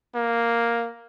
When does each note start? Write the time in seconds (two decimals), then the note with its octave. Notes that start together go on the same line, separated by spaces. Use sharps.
0.15 A#3